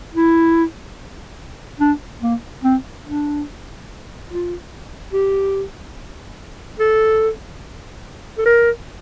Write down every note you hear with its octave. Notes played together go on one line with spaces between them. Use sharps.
E4
D4
A#3
C4
D4
F4
G4
A4
A4
A#4